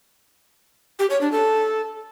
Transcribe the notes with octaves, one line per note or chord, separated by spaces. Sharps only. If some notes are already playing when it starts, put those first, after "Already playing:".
G4
C#5
D4
A4